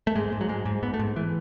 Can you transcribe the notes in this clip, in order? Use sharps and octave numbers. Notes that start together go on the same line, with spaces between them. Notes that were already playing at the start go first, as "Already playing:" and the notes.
A3
G#2 G#3
G#2
F#3
G#2 G#3
G#2
G#2 B3
A3
G#2
E3